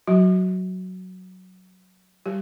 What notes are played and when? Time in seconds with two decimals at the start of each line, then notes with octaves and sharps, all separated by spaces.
0.07 F#3 F#4
2.26 G3 G4